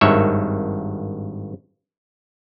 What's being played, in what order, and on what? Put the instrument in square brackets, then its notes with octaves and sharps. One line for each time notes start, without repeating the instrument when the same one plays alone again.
[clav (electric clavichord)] G#1 G2 D#3 C#5 E5